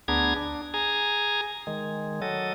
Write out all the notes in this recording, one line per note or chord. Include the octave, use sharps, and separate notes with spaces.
D2 B3 D4 G#4 A#5 G#6
D4
G#4 G#5 A#5
D#3 G#3
F#3 A4 D#5